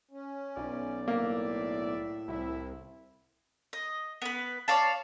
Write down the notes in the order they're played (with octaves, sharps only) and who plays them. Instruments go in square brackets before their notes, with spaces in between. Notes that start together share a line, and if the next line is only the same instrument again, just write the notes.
[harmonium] C#4
[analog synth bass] B1 [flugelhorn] D5
[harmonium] A2 E5 [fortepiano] A#3
[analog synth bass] C2 [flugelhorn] E4
[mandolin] D#5
B3 B4
C#5 D5 F5 A5